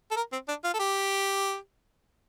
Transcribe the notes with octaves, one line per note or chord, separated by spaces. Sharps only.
A4
A#4
C4
D4
F4
A4
G4